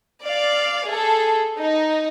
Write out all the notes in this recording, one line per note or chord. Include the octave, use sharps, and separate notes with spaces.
D5 F5
G#4 A4
D#4